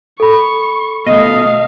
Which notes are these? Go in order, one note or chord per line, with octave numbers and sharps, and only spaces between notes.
A4 B5 C#6
B2 A3 D#5 F5